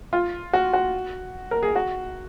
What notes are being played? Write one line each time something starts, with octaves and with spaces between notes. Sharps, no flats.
F4
F#4
F#4
A#4
G#4
F#4